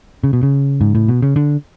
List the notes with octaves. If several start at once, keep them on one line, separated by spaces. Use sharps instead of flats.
C#3
B2
C#3
G#2
A2
B2
C#3
D3